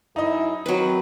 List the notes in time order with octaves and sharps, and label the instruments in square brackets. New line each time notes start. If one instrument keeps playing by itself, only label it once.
[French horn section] F#2 E4 [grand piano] D#4 D#5
[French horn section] D#3 C4 [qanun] F#3 B4